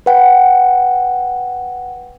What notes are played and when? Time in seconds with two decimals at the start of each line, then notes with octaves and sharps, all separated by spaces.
0.06 B4 F#5 G5